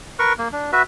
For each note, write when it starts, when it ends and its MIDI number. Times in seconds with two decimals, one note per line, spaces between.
0.19 0.33 70
0.19 0.33 71
0.19 0.33 85
0.38 0.48 58
0.52 0.71 62
0.73 0.82 66
0.73 0.82 71
0.73 0.82 76